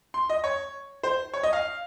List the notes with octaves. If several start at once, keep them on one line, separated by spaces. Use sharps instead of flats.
C6
D#5
C#5
C5
C#5
D#5
F5